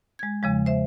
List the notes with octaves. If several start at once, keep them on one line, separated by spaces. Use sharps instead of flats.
G#3 G#6
E2 C#3 F3 G#3
C5 E5